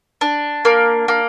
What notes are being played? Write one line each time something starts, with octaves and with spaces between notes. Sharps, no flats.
D4
A#3
A#3